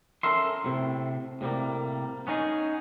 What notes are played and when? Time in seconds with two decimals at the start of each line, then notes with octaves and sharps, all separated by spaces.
0.23 C#4 A4 A#4 E5 C6
0.64 A2 C3
1.41 A2 C3 G3 A#3
2.27 B3 C#4 D#4 G#4